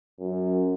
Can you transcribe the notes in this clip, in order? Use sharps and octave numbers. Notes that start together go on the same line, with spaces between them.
F#2